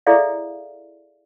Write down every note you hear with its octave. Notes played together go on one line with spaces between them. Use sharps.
E4 G#4 A4 D5 E5 F5